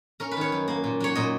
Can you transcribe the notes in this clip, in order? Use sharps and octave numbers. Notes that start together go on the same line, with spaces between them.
C#4 A#4
B4
D#3 C#5
F#2
A#3
A#2
F#3 C#5
A#2 D#5